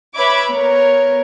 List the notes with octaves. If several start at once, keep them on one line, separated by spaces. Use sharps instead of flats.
B4 C#5 E5 B5 D6 G#6
B3 A#4 C#5